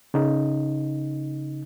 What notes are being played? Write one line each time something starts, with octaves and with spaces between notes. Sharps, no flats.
C#3 D#4